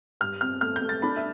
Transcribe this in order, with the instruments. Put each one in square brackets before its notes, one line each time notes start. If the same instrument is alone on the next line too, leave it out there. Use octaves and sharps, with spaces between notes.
[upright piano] G2 F6
C4 F6
A3 F6
G6
A3
A6
D4 B5
E5